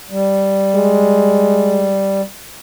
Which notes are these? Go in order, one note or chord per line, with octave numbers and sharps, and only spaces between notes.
G3
G#3